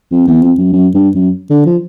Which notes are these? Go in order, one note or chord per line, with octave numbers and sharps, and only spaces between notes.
F2
E2
F2
F#2
F#2
G2
F#2
D3
F3